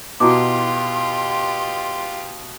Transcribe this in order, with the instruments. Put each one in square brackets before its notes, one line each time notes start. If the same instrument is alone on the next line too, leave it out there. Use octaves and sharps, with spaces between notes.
[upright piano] B2 [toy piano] E4 D6 [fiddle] F4 G4 [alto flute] C6